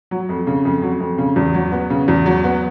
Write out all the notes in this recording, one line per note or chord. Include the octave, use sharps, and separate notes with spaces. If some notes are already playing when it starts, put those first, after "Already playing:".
F#3
F2
C#3
F2
F#3
F2
C#3
E2
F#3
B3
C#3
E2
F#3
B3